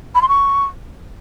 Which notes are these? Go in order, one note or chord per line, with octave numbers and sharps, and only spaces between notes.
B5
C6
C#6